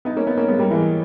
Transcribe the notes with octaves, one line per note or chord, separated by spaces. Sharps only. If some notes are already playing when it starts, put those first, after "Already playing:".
B3 D#4
A#3 C#4
B3 D#4
A#3 C#4
G#3 B3
G3 A#3
E3 G#3